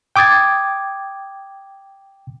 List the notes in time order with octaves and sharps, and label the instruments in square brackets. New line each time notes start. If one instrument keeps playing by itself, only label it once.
[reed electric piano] G5 D6 D#6 G#6 A6